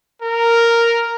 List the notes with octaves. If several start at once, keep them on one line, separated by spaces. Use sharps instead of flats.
A#4